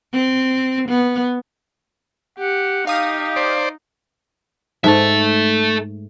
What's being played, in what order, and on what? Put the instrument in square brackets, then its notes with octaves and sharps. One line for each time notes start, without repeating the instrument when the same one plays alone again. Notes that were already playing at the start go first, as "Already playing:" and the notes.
[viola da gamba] C4
B3
[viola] G4 [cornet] F#5
[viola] D#4 [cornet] G4 [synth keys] F5 D#6
[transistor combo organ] C5 D5
[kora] G#2 A3 [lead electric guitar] A4 E5